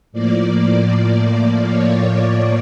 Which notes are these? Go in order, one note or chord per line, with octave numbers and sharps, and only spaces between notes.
A2 F3 A#3 D5
C#5